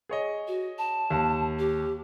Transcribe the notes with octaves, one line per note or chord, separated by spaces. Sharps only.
G#4 C#5 D#5
F#4
A5
D#2
G4